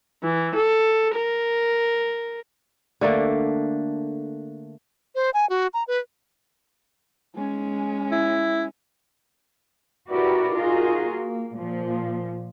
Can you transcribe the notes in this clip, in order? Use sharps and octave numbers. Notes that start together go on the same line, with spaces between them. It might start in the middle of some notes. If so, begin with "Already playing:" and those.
E3
A4
A#4
D3 A3 A#3
C5
G#5
F#4
A#5
B4
G#3 C#4
E4
E4 F#4 G4 A#4 B4 D5
D#4 F4 F#4 G#4 A#4
A#3
A#2 F3